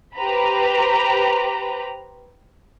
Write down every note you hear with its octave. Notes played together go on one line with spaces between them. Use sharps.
G4 B4 C5 A#5 B5